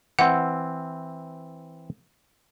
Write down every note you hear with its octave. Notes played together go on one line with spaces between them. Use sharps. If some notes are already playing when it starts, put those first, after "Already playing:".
E3 C4 F#5